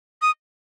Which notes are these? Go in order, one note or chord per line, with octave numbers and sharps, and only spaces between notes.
D#6